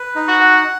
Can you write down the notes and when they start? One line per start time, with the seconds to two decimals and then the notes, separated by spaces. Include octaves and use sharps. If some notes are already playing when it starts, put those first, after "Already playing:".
Already playing: B4
0.15 D#4
0.28 F#4
0.41 F#5